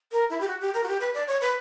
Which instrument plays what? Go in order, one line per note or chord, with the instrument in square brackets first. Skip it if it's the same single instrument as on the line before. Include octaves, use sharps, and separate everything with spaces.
[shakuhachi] A#4
E4
G4
F#4
G4
A#4
F#4
G4
B4
D5
C#5
B4